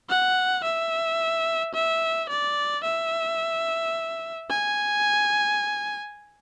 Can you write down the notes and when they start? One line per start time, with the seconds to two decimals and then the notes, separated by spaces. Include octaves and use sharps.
0.09 F#5
0.64 E5
1.75 E5
2.30 D5
2.84 E5
4.50 G#5